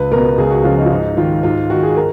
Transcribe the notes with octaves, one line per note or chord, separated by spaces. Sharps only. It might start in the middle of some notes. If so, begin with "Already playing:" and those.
Already playing: C#2 B4
B2 A#4
C#2 G#4
F#4
C#3 F3 F4
D#4
F4
G#2 D#4
D#3 F4
G#2 F4
D#3 F#4
G#4
A#4